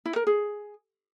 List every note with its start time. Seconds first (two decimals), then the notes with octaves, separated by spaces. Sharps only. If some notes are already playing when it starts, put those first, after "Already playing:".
0.05 E4
0.16 A#4
0.27 G#4